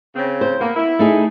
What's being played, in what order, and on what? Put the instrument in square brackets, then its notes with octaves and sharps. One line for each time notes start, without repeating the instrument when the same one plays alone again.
[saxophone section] C#3 C4
[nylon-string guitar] C5
[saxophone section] A#3 [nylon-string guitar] B3
[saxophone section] E4
[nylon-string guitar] A3 D#4 G#4